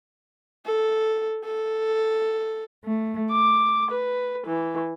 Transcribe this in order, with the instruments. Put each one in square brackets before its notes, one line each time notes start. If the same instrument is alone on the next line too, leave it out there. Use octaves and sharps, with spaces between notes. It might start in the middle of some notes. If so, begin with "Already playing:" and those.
[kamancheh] A4
A4
[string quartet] A3
D6
B4
E3